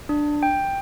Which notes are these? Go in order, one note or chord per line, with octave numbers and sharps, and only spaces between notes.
D4
G5